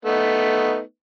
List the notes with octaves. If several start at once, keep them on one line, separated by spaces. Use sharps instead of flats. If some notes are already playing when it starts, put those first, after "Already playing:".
A3 B3 D#4